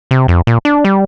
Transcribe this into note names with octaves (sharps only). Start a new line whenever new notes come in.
C3
F2
A#2
D4
G3